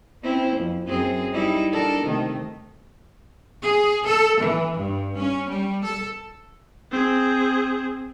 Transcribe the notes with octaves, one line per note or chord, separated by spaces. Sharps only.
C4 C#4 E4
F2
F#2 C4 G#4
G3 D#4 E4
D4 A4 A#4
C3 D#3 A3
G#4
A4
E3
G2
C#4
G3
A4
C4 G#4